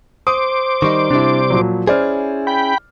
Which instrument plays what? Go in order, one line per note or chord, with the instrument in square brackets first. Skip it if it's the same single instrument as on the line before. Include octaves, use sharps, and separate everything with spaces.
[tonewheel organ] C5 D6 [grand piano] D#6
[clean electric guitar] D#3 G3 D#4 [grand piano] C#6
[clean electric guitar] C3 G3 [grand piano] D4 E4
[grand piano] A#2 F3 F#3
[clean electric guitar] C#4 E4 G#4 [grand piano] C5 D5 F6
[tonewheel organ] G5 B5